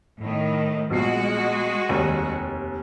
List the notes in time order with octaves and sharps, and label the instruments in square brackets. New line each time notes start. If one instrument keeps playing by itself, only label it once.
[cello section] A2 D#3
[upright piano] A#1 B2 C7 [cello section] G#3 F#4
[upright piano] F1 D#2